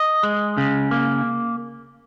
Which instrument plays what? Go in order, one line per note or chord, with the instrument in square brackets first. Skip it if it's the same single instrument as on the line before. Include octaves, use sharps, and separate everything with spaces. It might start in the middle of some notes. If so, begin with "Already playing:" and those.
Already playing: [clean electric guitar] D#5
G#3
C#3
A#3